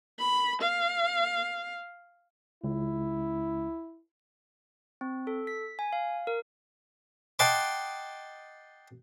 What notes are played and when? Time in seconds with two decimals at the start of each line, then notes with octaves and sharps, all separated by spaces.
0.19 B5
0.62 F5
2.64 C#2 E4
5.01 C4
5.27 A4
5.47 B6
5.79 G#5
5.93 F5
6.27 A#4
7.39 D#5 F#5 G5 A5 C6 D6